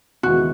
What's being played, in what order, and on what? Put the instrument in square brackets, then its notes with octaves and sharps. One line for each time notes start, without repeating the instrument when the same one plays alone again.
[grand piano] D#2 C#3 E3 G#3 B3 [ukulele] F#4